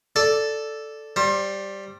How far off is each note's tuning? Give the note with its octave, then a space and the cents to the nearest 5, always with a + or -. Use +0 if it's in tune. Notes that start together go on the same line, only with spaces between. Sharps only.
A4 +0 D5 +0
G3 +0 C5 +30